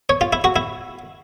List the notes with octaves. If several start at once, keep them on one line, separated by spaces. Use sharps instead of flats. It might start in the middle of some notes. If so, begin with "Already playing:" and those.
C#5
F4
E4
F#4
E4